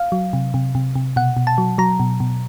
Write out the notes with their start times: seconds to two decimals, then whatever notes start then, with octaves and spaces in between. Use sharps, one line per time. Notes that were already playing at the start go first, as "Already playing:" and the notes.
Already playing: F5
0.12 F#3
0.33 C3
0.54 C3
0.75 C3
0.96 C3
1.16 B2 F#5
1.37 B2
1.47 A5
1.58 F#3
1.78 F#3 A#5
2.00 B2
2.20 B2